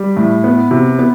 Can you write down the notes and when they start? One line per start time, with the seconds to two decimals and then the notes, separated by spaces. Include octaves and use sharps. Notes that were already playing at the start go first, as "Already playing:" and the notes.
Already playing: G3
0.17 A2
0.44 B3
0.71 C3
0.99 B3